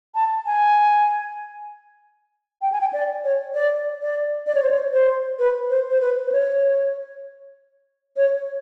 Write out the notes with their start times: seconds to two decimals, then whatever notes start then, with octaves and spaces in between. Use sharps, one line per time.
0.15 A5
0.46 G#5
2.62 G5
2.72 G#5
2.81 G5
2.93 D5
3.24 C#5
3.54 D5
4.01 D5
4.47 D5
4.55 C#5
4.62 C5
4.70 C#5
4.93 C5
5.39 B4
5.70 C5
5.89 C5
6.01 B4
6.27 C5
6.32 C#5
8.17 C#5